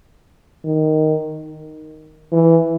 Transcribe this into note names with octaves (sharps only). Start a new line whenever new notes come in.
D#3
E3